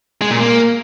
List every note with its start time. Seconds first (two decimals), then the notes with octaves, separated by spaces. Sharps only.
0.21 G#3
0.31 A#2
0.40 A#3